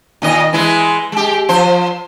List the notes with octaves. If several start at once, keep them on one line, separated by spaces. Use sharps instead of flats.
A#2 D#3 D#5
E3 G#3 E4
G#3 G4
F3 C5